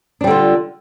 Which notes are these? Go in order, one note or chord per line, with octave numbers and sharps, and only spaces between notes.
D3 G3 D4 F4